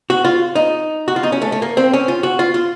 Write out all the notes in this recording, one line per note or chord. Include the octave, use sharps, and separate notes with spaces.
F#4
F4
D#4
F#4
F4
D#4
C#4
A3
A3
A#3
C4
C#4
F4
F#4
F4
F4